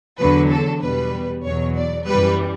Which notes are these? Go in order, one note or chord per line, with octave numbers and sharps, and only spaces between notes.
E2 D3 F#3 B4
A4
E2 B2 G3 B4
E2 B2 F#3 C#5
D5
F#2 E3 G3 B4